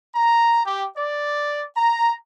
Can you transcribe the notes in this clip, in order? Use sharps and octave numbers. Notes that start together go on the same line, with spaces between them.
A#5
G4
D5
A#5